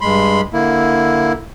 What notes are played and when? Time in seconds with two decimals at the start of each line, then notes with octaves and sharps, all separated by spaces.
0.01 G2 G#3 B5 C6
0.53 D3 A#3 E4